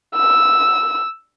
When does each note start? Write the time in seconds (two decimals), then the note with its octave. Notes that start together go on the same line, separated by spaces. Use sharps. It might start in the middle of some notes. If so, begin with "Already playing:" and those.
0.15 E6